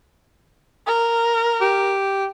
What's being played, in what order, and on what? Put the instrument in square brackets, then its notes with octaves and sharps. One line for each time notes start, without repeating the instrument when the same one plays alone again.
[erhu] A#4
[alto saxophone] G4